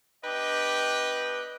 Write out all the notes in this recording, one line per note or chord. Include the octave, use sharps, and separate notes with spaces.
B3 D4 G4 B4 D#5 G5